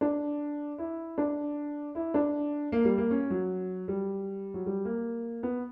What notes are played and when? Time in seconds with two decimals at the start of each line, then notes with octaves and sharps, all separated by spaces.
0.01 D4
0.78 E4
1.18 D4
1.95 E4
2.14 D4
2.72 A#3
2.85 G3
2.98 A#3
3.10 C#4
3.30 F#3
3.88 G3
4.54 F#3
4.66 G3
4.85 A#3
5.43 B3